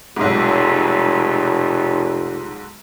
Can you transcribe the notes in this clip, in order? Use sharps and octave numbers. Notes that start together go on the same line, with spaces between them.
F1 B1 G#2